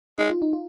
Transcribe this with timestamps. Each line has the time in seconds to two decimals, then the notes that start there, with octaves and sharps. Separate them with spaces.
0.18 G#3 D#4
0.30 F4
0.42 D#4
0.53 F4